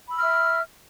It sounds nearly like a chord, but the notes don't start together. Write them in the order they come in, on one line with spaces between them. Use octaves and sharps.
B5 E6 F6 E5